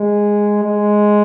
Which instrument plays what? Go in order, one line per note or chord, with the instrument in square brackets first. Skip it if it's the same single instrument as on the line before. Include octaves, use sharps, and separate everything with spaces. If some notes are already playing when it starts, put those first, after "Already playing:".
Already playing: [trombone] G#3
G#3